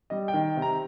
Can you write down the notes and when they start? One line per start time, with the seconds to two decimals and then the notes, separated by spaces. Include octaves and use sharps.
0.10 G3 D#5
0.28 G5
0.34 D#3
0.57 C3
0.62 A#5